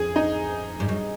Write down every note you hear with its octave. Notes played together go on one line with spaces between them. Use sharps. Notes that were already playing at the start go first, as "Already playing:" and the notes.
Already playing: F2 G#4
D#4
G2
F#2